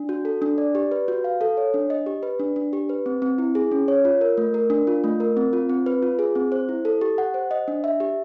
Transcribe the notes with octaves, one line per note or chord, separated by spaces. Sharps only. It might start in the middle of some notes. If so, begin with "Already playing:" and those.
Already playing: D4
F#4
A4
D4
D5
G4
B4
F#4
F5
A4
C#5
D4
D#5
G4
B4
D4
D4
G4
B4
C4
C4
E4
G#4
C#4
C#5
F4
A#4
A3
A#4
D4
F4
A3
A#4
C4
F4
C4
B4
F4
G#4
C4
C5
E4
A4
G4
F#5
C5
D#5
D4
E5
G4